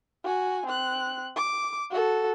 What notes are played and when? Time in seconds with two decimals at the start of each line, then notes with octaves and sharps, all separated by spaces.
0.24 F#4 G#5
0.66 C4 F#6
1.36 D6
1.91 F#4 A4